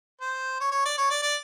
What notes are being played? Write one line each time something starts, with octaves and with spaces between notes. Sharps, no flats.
C5
C#5
C#5
D5
C#5
D5
D5